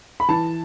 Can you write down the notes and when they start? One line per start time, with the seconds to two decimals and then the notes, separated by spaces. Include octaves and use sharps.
0.20 B5
0.29 E3 A5